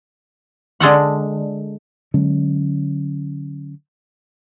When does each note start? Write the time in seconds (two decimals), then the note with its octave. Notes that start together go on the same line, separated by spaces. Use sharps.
0.80 D3 G#3 A4 F#5
2.14 D3 F#3 G#3 C#4